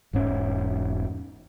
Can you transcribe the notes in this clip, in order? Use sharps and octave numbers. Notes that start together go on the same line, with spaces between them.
E1 G#2 C#4